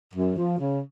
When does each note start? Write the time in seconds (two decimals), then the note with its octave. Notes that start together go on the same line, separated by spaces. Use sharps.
0.14 F#2
0.36 F3
0.58 C#3